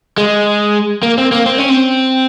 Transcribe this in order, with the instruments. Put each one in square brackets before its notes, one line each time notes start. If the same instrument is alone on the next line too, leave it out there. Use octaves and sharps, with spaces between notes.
[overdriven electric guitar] G#3
A#3
C4
A#3
C4
C#4
C4